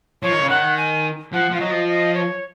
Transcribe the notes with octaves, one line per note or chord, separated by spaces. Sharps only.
F3 C#5
D#3
C#3
D#3 F#5
G#5
F3 F#5
F3 F5
F#3 D#5
F3
D#5
C#5